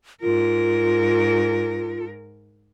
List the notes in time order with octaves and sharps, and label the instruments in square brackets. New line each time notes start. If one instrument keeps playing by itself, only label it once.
[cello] G#2 A#4 [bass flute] F4